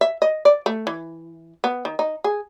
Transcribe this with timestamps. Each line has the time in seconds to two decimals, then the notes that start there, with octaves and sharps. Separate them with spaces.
0.01 E5
0.22 D#5
0.45 D5
0.66 A3
0.87 E3
1.64 B3
1.85 D#3
1.99 D#4
2.24 G#4